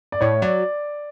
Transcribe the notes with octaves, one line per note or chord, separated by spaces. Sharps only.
D5
A2 C#5
F#3 D5